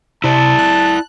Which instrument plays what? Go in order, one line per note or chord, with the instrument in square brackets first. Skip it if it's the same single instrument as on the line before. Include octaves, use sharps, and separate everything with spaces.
[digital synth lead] C3 [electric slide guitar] E4 D5 [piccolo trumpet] A5
[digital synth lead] F#6